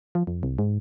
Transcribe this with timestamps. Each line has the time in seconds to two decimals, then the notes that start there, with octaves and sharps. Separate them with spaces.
0.15 F3
0.27 F2
0.43 C2
0.59 G#2